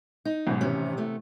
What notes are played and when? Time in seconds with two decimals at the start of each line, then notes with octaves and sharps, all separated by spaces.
0.25 D#4
0.47 B1 G#2 B2
0.61 A1 C3 D#3 E3 C#4
0.97 C3 A3 B3